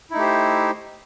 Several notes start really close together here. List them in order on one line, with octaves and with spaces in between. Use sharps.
E4 D#4 A3 G4 C5